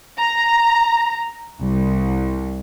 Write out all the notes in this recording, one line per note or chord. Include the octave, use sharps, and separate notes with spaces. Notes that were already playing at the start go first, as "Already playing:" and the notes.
A#5
C2